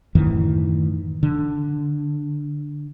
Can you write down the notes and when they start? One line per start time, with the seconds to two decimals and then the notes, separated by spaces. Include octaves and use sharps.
0.15 F#2 A2 D#3 E3
1.23 D3